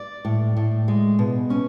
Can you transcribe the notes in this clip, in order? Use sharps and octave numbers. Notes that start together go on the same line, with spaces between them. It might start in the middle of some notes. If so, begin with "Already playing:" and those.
Already playing: D5
A2
A2
G#3
B2
C#4